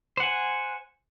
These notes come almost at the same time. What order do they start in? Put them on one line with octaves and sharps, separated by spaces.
C5 F#5 G#5